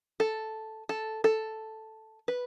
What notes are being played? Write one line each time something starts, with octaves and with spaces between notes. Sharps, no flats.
A4
A4
A4
B4